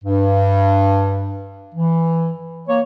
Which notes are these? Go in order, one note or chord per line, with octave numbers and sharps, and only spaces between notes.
G2
E3
A#3 C#5